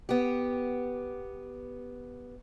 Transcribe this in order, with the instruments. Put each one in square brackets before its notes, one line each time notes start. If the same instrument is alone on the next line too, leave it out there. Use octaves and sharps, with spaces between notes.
[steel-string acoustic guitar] B3 G4